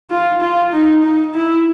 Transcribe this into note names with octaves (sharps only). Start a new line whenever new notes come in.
F4
F4
D#4
D#4
E4